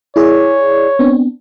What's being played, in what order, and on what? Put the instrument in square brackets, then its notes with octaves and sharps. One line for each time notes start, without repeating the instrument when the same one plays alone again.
[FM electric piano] E4 G#4 D5 [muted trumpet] C#5
[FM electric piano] B3 C4 D4